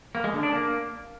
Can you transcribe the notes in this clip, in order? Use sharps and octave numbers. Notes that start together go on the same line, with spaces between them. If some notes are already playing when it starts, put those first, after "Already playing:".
A#3
G#3
D3
D4
A#3